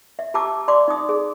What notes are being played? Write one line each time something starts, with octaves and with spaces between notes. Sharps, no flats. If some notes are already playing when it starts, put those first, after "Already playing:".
E5
G4 A5 A#5 D6 E6
D5 C6 D6
D#4 D#6
G#4